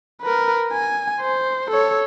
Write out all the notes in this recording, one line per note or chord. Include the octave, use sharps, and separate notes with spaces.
A#4 B4
G#5
C5
A4 C#5